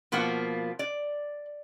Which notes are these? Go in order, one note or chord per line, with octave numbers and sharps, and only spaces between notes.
B2 F3 A#3 B3 F4 F#5
D5